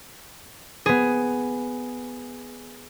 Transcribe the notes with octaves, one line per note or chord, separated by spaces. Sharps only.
B3 G#4